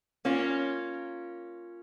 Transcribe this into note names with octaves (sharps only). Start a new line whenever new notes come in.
A#3 C#4 F4